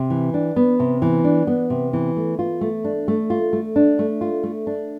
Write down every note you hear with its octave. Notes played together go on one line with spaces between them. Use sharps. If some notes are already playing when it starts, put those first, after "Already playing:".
Already playing: C3
E3
D4
B3
C3
E3
D4
B3
C3
E3
A3
F4
A3
D4
A3
F4
A3
D4
A3
F4
A3
D4